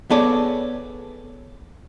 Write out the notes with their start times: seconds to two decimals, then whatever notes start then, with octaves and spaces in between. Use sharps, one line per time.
0.10 B3 G#4 A4 C#5 D5